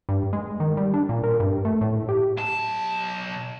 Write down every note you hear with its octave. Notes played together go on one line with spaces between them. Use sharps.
G2
G#3
D#3
G3
D4
A#2
A#4
G2
A3
A2
G4
B1 A5